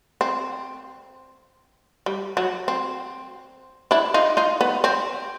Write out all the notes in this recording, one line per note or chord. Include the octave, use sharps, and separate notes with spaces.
C4
G3
F#3
C4
D4 E4
D#4 F4
D#4 F4
B3
C4